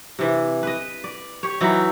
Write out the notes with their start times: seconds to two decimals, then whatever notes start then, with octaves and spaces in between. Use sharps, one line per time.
0.19 C3 E3
0.63 B4 D#5
1.04 D5
1.43 G4 C#5
1.61 E3 F#3 D#4 E4